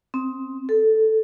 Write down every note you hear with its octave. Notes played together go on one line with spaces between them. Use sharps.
C4
A4